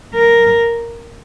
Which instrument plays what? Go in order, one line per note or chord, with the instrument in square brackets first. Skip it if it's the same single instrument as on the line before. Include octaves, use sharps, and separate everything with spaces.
[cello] A#4